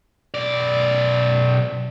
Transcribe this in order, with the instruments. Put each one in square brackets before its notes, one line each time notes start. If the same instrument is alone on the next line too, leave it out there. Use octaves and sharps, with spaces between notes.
[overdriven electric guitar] B1 D5